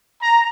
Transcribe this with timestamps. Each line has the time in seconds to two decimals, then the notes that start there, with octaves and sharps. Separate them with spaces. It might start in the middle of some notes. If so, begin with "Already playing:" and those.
0.22 A#5